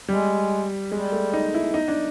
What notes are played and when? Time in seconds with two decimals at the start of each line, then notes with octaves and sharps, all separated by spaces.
0.08 G3 G#3
0.92 G3 G#3
1.12 A3
1.33 D#4
1.54 E4
1.74 D#4
1.88 D4